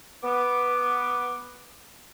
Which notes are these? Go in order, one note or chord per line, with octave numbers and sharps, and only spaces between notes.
B3 D6